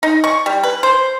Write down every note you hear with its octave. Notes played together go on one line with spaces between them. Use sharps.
D#4
C#6
G3
B4
C5